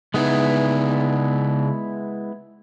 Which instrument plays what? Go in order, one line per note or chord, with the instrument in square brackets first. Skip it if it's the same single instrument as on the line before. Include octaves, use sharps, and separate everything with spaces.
[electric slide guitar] C#3 D#4 B4 [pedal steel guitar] G#3 B3 E4